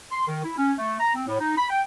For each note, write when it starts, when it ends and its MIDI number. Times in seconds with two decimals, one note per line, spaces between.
0.12 0.24 84
0.27 0.43 51
0.44 0.57 64
0.57 0.73 61
0.78 0.97 57
1.00 1.10 82
1.14 1.23 60
1.27 1.38 45
1.40 1.57 63
1.58 1.67 83
1.70 1.82 79